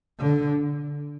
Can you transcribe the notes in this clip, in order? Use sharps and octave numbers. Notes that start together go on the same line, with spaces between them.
D3